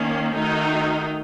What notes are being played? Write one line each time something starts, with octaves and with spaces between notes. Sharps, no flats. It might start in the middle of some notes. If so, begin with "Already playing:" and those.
Already playing: D#3 A#3 C#4
D#3 A3 D#4 F#4 A#4